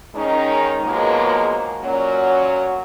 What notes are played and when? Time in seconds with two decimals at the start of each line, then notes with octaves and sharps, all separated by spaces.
0.15 D#3 G#3 C#4 D#4
0.83 G#2 B2 F3 F#3 G#3 A#3
1.81 A#2 F#3 C#4